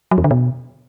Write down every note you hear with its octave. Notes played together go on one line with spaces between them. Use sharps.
F#3
E2
D3
B2